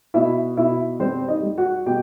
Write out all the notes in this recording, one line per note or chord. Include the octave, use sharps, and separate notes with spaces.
B2 E4 E5
B2 E4 E5
G3 C4 C5
D#4 D#5
G3
F#4 F#5
B2 G4 G5